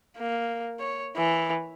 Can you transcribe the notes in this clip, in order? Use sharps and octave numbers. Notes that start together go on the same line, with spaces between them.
A#3
C#5
E3